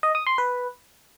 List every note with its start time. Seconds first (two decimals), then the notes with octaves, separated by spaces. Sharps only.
0.03 D#5
0.15 D#6
0.27 C6
0.38 B4